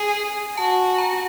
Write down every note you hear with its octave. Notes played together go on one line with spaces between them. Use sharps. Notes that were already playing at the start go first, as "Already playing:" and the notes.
Already playing: G#4 G#5
F#4 A5
A#5